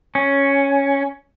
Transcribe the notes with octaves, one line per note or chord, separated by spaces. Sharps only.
C#4